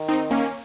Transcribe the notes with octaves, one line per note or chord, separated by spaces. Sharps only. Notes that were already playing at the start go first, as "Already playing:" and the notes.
Already playing: D#3
C4 D#4
A#3 C#4